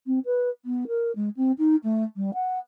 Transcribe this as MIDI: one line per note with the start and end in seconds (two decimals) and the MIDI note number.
0.06 0.19 60
0.25 0.49 71
0.65 0.84 59
0.88 1.11 70
1.15 1.29 56
1.36 1.52 60
1.58 1.75 63
1.83 2.04 57
2.16 2.30 55
2.34 2.59 78